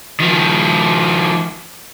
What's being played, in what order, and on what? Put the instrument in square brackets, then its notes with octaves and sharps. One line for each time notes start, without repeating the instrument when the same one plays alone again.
[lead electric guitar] D#3 F3